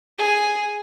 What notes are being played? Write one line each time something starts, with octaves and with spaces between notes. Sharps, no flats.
G#4